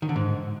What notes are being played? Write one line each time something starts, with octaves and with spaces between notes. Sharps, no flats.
D#3
D3
G#2